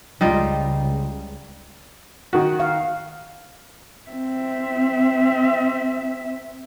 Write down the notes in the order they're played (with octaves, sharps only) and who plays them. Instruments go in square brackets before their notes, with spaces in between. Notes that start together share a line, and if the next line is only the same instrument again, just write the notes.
[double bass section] C#2 [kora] G3 D#4 F4
[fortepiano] D#3 F#4
[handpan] F5
[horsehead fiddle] C4 E5